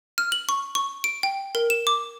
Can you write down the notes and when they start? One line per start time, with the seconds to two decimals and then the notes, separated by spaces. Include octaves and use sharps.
0.18 F6
0.32 F#7
0.49 C#6
0.75 C#6
1.04 D7
1.23 G5
1.55 A#4
1.70 E7
1.87 D6